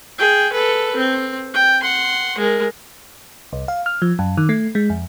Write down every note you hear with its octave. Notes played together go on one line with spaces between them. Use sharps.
G#4 G5
A4 B4
C4
G5
F#5 C6
G#3 A#4
C2
F5
F6
F3
F#2
D#3
A3
G#3
F2